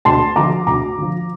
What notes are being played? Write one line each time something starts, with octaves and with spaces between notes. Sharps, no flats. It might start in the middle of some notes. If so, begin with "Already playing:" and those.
D2 A5 C6
D3 F3 A#5 D6
D2 A#5 D6
D3 F3